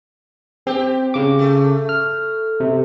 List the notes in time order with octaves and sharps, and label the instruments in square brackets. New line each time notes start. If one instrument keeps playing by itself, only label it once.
[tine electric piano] C4 [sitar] G4
[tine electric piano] C#3 D6
[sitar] A3
[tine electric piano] F6
C3